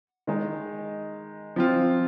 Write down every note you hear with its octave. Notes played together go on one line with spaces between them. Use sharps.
D#3 G#3 D#4
F3 C4 F4